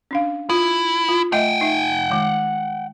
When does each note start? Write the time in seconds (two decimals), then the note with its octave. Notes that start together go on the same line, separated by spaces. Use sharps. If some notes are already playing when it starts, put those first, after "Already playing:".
0.11 C#4 D4 F5
0.49 E4 F4
1.09 F4
1.32 A3 D#5 E5 F#5 G5
1.61 D#4 E5
2.10 D#3 G#3